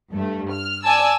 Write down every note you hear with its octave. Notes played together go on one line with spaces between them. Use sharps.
G2 A3
F6
D5 G#5 A5 E6